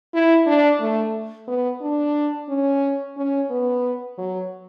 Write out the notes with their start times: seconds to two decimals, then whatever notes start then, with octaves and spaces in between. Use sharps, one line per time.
0.13 E4
0.46 D4
0.80 A3
1.48 B3
1.81 D4
2.49 C#4
3.17 C#4
3.50 B3
4.18 F#3